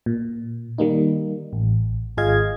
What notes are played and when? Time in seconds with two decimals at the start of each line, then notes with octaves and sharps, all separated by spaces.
0.06 A#2
0.78 D#3 G3 A#3 D#4
1.53 A1
2.17 G#1 F4 G#4 D#5 F5 G#6